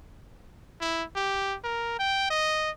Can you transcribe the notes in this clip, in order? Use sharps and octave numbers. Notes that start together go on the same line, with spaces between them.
E4
G4
A#4
G5
D#5